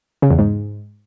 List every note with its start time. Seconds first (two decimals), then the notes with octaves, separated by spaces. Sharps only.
0.22 C#3
0.31 E2
0.39 G#2